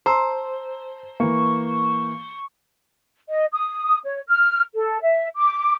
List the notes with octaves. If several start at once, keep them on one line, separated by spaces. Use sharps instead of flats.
C5 A5 A#5 C6 E6
E3 A#3 C#6
D#5
D#6
C#5
F6
A4
E5
D6